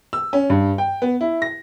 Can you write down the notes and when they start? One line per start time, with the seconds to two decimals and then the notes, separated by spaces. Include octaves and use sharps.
0.13 E6
0.33 C#4
0.50 G2
0.78 G5
1.02 B3
1.21 E4
1.42 A#6